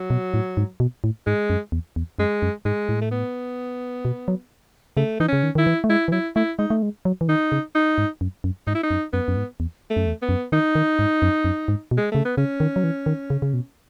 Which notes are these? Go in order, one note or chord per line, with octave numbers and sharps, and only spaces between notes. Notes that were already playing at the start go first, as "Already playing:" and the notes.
Already playing: F#3
B2
A2
G#2
B2
A2
G#2 G#3
F#2
E2
E2
F#2 G#3
F#2
G#2 G#3
A2
A3
B3
B2
F#3
C#3 A3
E3 D#4
C#3 C#4
D#3
D#3 E4
E3
A3
G#3 E4
E3
F#3 E4
A3 E4
G#3 D#4
A3
G#3
F#3
E3
D#3 D#4
C#3
D#4
G#2
F#2
F#2
G#2 D#4
E4
D#4
F#2
F#2 B3
F#2
G#2
E2
A3
F#2
E2
B3
F#2
D#3 D#4
D#3
G#2
F#2
F#2
G#2
B2
G#3
C#3 A3
B3
C#3 C#4
D#3
F#3
E3
D#3
C#3
C#3
B2